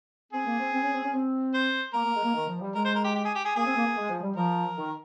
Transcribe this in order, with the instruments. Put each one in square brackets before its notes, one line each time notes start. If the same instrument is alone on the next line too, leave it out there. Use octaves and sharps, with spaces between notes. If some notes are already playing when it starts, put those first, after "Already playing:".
[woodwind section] C4 [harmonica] G#4
[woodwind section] A#3
C4
C4
C#4
C4
C#4
C4
[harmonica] C5
[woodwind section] A#3 [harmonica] A#4
[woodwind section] A#3
G#3
A#3
D#3
F3
G3
[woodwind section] G#3 [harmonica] A#4
[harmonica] C5
A#4
G4
G4
G#4
G4
G#4
[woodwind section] A#3 [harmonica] G#4
[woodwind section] C4
A#3
A#3
G#3
F3
G3
[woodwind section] F3 [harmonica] A#4
[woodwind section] D#3